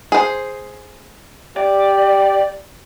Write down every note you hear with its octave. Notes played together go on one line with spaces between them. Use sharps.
G#4 C5
G4 D5